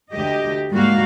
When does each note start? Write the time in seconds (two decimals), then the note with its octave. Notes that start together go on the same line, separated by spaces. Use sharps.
0.13 D2 G4 D#5
0.71 G#2 G3 A#3 F#4 F5